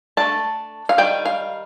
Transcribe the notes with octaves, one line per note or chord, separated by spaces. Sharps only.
A3 D4 A5
F5
D#3 G3 D4 G5
F5